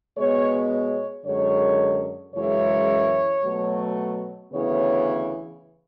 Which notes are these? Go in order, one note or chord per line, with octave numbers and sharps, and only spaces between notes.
B2 G#3 B3 C#5
C#5
F#2 D3 G#3 C#5
F#2 C#3 E3 G#3 C#5
B2 F#3 A3
D2 C#3 E3 B3 C#5